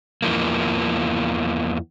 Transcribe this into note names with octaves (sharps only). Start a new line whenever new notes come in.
E2 E3 F3 A#3